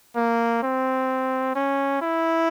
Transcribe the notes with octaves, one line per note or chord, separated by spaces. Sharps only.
A#3
C4
C#4
E4